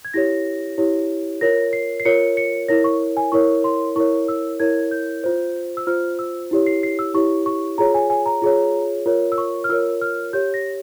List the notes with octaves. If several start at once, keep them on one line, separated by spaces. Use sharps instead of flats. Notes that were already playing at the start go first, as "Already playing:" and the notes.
G#6
E4 G4 C#5 A#6
E4 G4 C#5
F4 A#4 C#5 A#6
C7
C7
F4 A#4 C#5 C#7
C#7
E4 A#4 C#5 A#6
C#6
G#5
E4 A#4 C#5 C#6
C6
E4 A#4 C#5 C#6
E6
E4 A#4 C#5 G#6
G6
F4 C5
E6
F4 C5 F6
E6
E4 G4 C#5
C7
C7
E6
E4 G4 C#5 C#6
C#6
F4 G#4 C#5 A#5
G#5
G#5
A#5
F4 G#4 C#5
F4 A#4 C#5
E6
C#6
F6
F4 A#4 C#5 E6
F6
G4 C#5 G6
A#6